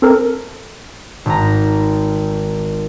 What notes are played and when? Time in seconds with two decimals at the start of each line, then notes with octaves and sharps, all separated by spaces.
0.02 C4 A4 A#4
1.26 G#1 A#5